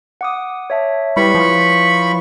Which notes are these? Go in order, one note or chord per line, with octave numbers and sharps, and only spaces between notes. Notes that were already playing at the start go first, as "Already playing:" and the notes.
F#5 D6 D#6
C#5 E5 A5
G3 E4 B4 C#5 B5 C#6
F3